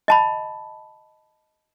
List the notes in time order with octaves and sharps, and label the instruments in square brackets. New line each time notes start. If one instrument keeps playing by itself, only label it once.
[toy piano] D#5 A5 B5